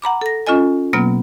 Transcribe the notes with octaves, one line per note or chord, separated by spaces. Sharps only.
F#5 A#5 B5 D6
A4 A#6
C#4 F4 A4 D#5 G#5
B2 F#3 A#3 B3 F6